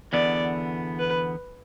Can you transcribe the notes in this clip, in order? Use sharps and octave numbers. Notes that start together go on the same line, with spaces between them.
E2 D3 B3 D5
B4